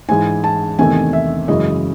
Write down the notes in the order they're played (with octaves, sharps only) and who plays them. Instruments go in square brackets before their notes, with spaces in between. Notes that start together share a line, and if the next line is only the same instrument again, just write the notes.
[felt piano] G#2 E3 G#3 G#5
A5
E2 C3 D#3 A3 G#5
E5
F#2 C#3 E3 G#3 D#5